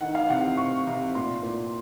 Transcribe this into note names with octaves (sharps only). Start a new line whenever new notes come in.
D#3 F#5
F5
C3 F#5
C3 C#6
C3
A#2 C6
A#2